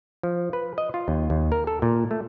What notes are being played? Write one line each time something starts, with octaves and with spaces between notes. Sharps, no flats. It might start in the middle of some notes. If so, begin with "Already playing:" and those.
F3
B4
D#5
F4
D#2
D#2
A#4
A4
A#2
A3